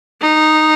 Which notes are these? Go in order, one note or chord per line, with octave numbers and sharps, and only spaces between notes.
D#4